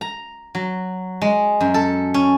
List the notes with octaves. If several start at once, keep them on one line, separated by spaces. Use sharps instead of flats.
A#5
F#3
G#3
F#2
A4
C#4